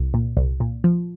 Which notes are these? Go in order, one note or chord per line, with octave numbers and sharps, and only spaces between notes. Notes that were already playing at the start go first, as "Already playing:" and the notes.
Already playing: C2
A#2
C2
A#2
F3